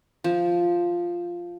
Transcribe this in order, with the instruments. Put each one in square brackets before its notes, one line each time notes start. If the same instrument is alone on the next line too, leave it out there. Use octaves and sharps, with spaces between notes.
[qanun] F3